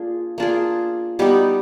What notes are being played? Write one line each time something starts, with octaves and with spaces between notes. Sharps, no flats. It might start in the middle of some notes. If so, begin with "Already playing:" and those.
Already playing: A#3 D4 F4 G#4
A#3 D4 F4 G#4
G3 B3 D#4 G4